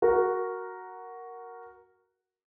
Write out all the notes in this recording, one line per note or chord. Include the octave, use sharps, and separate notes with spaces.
F#4 A#4